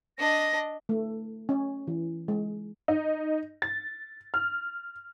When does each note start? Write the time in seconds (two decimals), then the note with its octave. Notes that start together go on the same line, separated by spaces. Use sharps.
0.19 D4 D#5 A#6
0.89 A3
1.49 C#4
1.87 E3
2.28 G#3
2.88 D#4
3.62 A6
4.34 F6